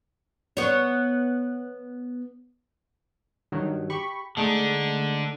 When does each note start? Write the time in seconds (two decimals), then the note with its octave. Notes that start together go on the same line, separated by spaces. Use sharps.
0.57 B3 C#5
3.52 G2 D#3 F#3
3.90 G4 B5 C#6
4.37 D3 G#3 A3 D#4